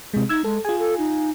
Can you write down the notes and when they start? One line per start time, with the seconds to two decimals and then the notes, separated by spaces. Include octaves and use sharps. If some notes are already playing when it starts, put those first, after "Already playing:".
0.13 C3 G#3
0.29 D#4 E6 G#6
0.44 G#3 A4
0.65 F4 G#4 G#5
0.79 A4
0.98 D#4